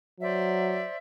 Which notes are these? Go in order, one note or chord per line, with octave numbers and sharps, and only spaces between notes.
F#3 C5 D5 E5